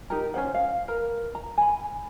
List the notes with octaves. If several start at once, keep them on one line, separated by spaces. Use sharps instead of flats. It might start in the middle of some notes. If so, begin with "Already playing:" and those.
D#4 G4 A#4
C#4 D4 C5 F#5
F5
A#4 B4 A#5
A#5
G#5 B5